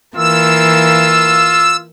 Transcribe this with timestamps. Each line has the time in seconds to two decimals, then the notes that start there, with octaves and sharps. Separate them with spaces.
0.16 E3 A#3 F4 E6